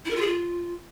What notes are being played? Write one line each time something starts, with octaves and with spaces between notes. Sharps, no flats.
E4
A#4
F4
G#4
F4